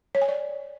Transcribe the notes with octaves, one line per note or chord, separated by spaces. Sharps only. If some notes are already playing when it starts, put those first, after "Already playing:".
C#5
G#5
D5